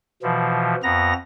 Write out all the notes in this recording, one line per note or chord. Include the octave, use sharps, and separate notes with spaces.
B2 E3 F3
F2 B3 A#5 A#6